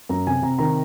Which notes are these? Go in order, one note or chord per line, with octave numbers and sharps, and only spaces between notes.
F#2 A#5
C3 G#5
C3 A#5
D#3 A#5